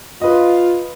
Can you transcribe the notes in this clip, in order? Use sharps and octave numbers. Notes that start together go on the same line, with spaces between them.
F4 B4 D#5